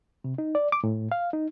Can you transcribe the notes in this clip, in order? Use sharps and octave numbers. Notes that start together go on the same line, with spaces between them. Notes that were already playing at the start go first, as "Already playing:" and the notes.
C3
D#4
D5
D6
A2
F5
D#4